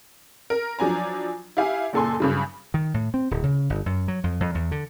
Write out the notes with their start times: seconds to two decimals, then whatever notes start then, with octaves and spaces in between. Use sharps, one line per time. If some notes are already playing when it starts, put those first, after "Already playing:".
0.50 A#4
0.79 F3 F#3 D4 G#5 A#5
1.57 E4 G4 F5 G#5
1.93 F#1 A#2 A4 G#5 C6
2.20 G2 C#3 F#3
2.74 D#3
2.94 A2
3.14 C4
3.31 D1
3.44 C#3
3.70 G1
3.86 F#2
4.08 F#3
4.24 F2
4.40 F2
4.55 E2
4.72 D3